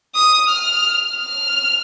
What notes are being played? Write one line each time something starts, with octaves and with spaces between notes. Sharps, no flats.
D#6
F6
F6